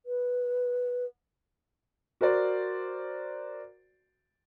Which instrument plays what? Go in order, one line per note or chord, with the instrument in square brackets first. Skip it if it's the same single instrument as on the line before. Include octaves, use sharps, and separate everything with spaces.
[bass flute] B4
[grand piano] F#4 A#4 C5 D5